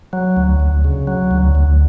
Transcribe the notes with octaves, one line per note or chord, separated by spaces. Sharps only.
F#3
D2
D2
C#3
F#3
D2
D2